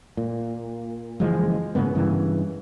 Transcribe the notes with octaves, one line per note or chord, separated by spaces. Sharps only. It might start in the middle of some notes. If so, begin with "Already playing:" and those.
A#2
F#1 E3 F3 G#3
G#2 C#3 A#3 B3
G2 C#3 E3